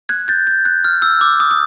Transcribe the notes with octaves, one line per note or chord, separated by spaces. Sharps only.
F#6 G#6
G6 A6
G6
F#6
F6
E6
D6
D#6
D#6